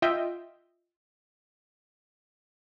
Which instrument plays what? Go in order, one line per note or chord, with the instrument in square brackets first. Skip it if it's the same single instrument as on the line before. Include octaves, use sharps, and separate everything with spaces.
[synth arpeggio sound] F4 D#5 E5 G5